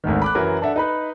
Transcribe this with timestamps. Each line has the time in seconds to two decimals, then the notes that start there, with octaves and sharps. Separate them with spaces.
0.04 G#1 D2 G#2 D#3
0.22 B5 D6 F#6
0.35 F#2 E3 F#3 A#4 B4
0.62 D4 A4 E5 F#5
0.76 D#4 B4 B5